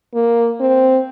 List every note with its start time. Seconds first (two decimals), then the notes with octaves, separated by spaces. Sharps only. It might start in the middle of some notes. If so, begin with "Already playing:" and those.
0.14 A#3
0.60 C4